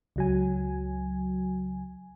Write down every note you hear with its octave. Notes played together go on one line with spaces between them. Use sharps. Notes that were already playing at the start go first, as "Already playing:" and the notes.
C#2 F#3 G#5